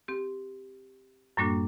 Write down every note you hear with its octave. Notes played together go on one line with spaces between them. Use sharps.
C4 G4
F#2 A2 G3 A#3 D4 F#4